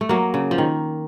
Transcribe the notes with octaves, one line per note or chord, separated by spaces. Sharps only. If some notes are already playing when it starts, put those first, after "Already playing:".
A3
F#3 A#3
C#3
F3
D#3